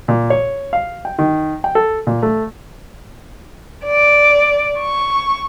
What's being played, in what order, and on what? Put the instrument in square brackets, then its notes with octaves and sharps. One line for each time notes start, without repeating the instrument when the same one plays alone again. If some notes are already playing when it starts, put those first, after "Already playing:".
[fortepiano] A#2
C#5
F5
G5
D#3
G5
A4
A#2
A3
[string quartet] D5
C#6